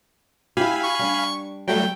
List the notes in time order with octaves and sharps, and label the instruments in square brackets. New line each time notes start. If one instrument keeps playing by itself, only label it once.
[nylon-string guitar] E4 G4 [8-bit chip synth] F5 G#5 B5
[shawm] C#6
[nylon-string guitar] G3 D4
[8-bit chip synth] F#3 G3 A3 [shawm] G5